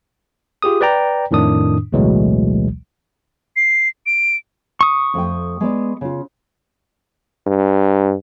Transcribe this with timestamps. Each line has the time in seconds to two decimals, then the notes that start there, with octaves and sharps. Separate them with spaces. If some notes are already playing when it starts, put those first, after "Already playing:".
0.62 F4 G4 G#4 D#6
0.81 B4 D5 G5 A#5
1.31 F2 A2 D#3 D4 D#6
1.92 A1 D2 B2 E3 F#3 G#3
3.56 C7
4.06 D7
4.81 C#6 D#6
5.14 F2 A3 G5
5.60 G#3 B3 D5
6.01 C#3 F4
7.47 G2